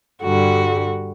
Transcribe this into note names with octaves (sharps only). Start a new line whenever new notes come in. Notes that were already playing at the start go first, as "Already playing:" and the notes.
G2 D3 G3 F#4